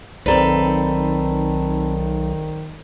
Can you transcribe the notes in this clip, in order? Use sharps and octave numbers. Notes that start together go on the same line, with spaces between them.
B1 D#3 C4 A4 B4 C5 D5 A#5